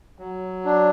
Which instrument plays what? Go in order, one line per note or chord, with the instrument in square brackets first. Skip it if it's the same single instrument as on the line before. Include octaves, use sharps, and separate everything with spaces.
[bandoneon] F#3
D4